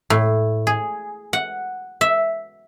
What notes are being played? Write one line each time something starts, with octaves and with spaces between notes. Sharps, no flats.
A2
G#4
F#5
E5